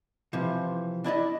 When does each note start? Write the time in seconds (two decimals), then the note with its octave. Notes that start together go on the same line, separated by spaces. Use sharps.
0.33 C3 E3 F3
1.04 D4 E4 D5 D#5